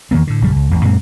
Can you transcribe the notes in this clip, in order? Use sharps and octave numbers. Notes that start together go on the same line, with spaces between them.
E2 D#3 A#3 B3
A2 D3
A#1 F#2 C#3 G3
C#2
A1 E2
F#2 A#2 G#3 C4